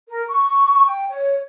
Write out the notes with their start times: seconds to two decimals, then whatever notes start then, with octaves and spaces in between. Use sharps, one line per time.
0.09 A#4
0.28 C#6
0.86 G5
1.09 C#5